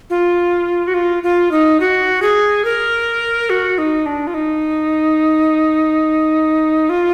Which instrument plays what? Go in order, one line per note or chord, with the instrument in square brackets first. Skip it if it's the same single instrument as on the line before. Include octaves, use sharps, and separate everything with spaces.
[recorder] F4
F#4
F4
F4
D#4
F#4
G#4
A#4
F#4
D#4
D4
F4
D#4
F4